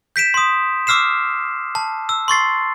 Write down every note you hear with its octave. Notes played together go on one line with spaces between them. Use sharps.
G6 B6 D7 E7
C6 D#6
D6 E6 F6 C7 E7
A5
E6
C6 C#6 A6 C7